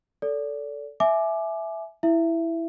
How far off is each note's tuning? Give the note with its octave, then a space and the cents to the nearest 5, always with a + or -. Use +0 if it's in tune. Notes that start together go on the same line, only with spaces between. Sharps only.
A4 +0 D5 -30
E5 +0 G#5 +30 D6 +10
E4 +0 E5 +20